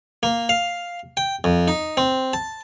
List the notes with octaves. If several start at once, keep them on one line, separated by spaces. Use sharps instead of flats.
A#3
F5
G5
F2
D#4
C4
A5